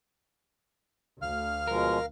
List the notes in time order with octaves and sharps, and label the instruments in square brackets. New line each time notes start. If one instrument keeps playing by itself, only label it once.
[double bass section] D2 [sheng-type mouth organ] F5 F6
[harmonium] B2 F3 G#3 [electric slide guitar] A#4